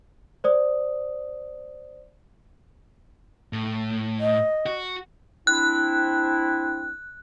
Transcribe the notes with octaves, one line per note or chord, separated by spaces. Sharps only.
C5 D5 D#6
A2
D#5
F#4
C4 D4 E4 F#6